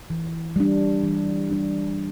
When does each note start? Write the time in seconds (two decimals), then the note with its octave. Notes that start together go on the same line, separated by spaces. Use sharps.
0.10 E3
0.56 G3 D4
1.04 E3
1.51 G3 D4